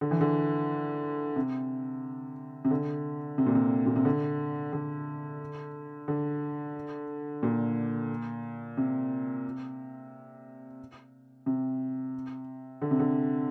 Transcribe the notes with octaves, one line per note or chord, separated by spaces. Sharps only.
D3
E3
D3
C3
C3
D3
C3
A#2
C3
A#2
C3
D3
D3
D3
A#2
C3
C3
D3
C3
D3